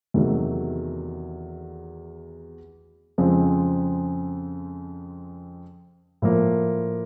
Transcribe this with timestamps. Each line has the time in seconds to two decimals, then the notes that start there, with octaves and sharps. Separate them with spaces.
0.14 E2 C3 D#3 F#3 A3
3.18 F2 C#3 F3 G#3 C4
6.22 A2 F3 A#3